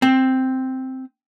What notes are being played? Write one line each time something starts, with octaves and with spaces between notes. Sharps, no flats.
C4